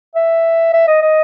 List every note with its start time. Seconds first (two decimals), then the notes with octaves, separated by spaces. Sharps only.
0.15 E5
0.73 E5
0.87 D#5
1.02 D#5